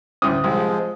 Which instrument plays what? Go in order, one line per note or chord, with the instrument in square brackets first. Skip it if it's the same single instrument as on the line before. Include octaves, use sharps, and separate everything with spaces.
[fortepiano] D2 A2 C#4 [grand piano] D#6
[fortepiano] C2 [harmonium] F3 G#3
[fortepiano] C4